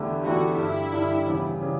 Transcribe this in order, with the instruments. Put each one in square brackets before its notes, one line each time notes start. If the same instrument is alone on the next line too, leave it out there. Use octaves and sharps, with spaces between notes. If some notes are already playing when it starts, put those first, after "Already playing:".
Already playing: [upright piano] E2 D3 A3 E4 G4
[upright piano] E2 D3 A3 E4 G4 [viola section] F#4
[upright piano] G2 D3 G3 [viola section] E4
[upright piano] G2 D3 G3
E2 C#3 E3 G3
C#3 E3 G3